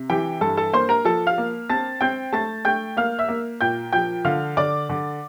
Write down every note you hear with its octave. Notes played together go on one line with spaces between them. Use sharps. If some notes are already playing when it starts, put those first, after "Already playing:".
Already playing: C3
E3 G4 G5
G2 A4 A5
A4 A5
A#3 C5 C6
A#4 A#5
F3 A4 A5
F5 F6
A#3
C4 A5 A6
C4 G5 G6
A3 A5 A6
A3 G5 G6
A#3 F5 F6
E5 E6
A#3
A#2 G5 G6
F3 G5 G6
D3 F5 F6
D3 D5 D6
D3